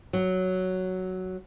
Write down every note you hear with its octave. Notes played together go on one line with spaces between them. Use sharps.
F#3